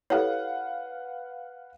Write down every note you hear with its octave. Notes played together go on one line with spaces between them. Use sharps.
E4 G4 A4 B4 C#5 F5 F#5